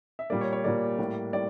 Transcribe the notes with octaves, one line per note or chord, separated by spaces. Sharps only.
E5
A#2 G3 A#3 D5
C#5
C#5
A#2 G3 A#3 D5
A2 G3 A#3
A2 G3 D5